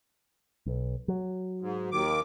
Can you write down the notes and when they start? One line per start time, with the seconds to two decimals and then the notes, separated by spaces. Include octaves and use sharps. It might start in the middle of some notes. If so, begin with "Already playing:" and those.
0.66 B1
1.08 F#3
1.61 G#2
1.92 D#2 D#3 D6